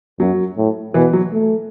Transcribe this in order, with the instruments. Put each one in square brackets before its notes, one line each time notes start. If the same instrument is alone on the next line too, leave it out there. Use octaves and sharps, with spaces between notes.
[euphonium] F#2 [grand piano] F#3
[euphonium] A2
[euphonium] B2 [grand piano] E3
[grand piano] F#3
[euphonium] A3